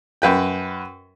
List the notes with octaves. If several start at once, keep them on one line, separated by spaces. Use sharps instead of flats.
F#2 B4 G5